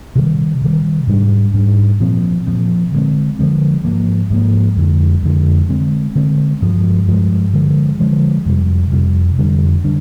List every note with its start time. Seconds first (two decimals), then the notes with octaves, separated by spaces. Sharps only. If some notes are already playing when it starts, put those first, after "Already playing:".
0.15 C3 D#3 G3
0.61 C3 D#3 G3
1.07 G#2 G3 D4
1.53 G#2 G3 D4
2.00 A#2 F3 C4
2.47 A#2 F3 C4
2.92 D3 F3 G#3 C4
3.39 D3 F3 G#3 C4
3.85 G#2 F3 A#3
4.30 G#2 F3 A#3
4.76 F2 D3 G#3
5.23 F2 D3 G#3
5.69 D3 G#3 C4
6.15 D3 G#3 C4
6.62 G2 F3 G#3
7.08 G2 F3 G#3
7.54 D3 F3 G#3
8.00 D3 F3 G#3
8.45 F2 C3 G3
8.92 F2 C3 G3
9.38 F2 D3 G3 D4
9.84 D3 G3 D4